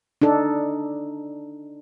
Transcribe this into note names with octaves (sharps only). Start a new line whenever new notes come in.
D4 D#4 A4